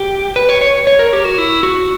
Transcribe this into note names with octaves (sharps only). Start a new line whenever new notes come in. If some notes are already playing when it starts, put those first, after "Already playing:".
Already playing: G4
B4
C#5
C#5
C#5
A#4
G4
F#4
E4
F#4